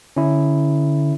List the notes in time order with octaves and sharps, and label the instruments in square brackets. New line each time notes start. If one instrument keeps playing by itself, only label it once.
[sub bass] D3 [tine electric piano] C#4 E4